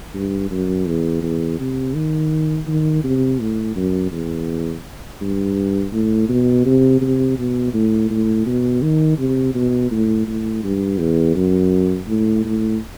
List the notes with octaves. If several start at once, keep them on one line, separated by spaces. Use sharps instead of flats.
G2
F#2
E2
E2
C3
D#3
D#3
C3
A2
F#2
E2
G2
A2
B2
C3
C3
B2
A2
A2
B2
D#3
C3
B2
A2
A2
G2
E2
F#2
A2
A2